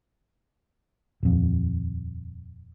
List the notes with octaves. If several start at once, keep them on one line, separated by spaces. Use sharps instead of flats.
D#1 F2